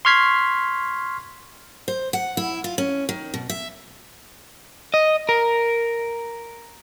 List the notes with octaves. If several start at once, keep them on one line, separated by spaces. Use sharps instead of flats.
C6 C#6 F6 G#6 B6 C7
C5
F#5
E4
F4
C#4
D#3
B2
E5
D#5
A#4